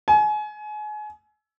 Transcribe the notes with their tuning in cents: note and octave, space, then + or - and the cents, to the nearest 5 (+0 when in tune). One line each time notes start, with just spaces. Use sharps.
G#5 +30